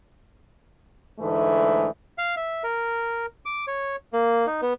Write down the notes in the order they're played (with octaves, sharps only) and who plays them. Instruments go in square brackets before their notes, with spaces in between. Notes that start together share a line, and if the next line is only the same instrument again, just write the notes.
[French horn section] G#2 D3 E3 A3
[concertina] F5
E5
A#4
D6
C#5
A#3
D#4
B3